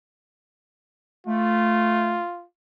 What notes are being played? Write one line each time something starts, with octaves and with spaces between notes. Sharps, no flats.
A3 F4